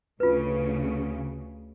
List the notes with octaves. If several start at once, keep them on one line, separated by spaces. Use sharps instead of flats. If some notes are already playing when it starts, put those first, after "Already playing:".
D2 C#3 F4 B4